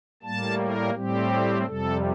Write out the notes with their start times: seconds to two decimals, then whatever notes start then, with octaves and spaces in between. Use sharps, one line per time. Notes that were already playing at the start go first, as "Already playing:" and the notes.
0.23 A2 G3 A#3 A5
0.58 A#4
0.94 A2 G3 C4 G4
1.65 F2 C3 G3 A4